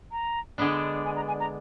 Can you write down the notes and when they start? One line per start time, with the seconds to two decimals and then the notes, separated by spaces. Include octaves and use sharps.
0.12 A#5
0.58 D3 G#3 B3 D4
1.05 G#5
1.16 A#5
1.28 G#5
1.40 A#5